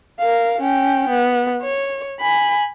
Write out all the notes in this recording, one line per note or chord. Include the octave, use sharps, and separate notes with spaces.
A#4 F5
C#4 G5
B3
C#5
G#5 B5